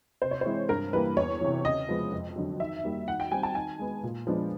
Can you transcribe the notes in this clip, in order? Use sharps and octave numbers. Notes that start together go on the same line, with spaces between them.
C3 C5
C#5
C5
E3 G#3 C4 E4
G2 A#4
E3 G3 A#3 B4
E2 C#5
C3 E3
C#3 D#5
F3 G#3 B3
F2
D3 F#3
D#3 E5
G3 A#3 D#4
D#3 F#5
G5
G3 C4 D#4 G#5
A5
D#3 G#5
G#3 B3
A#2
F3 G#3 B3 D4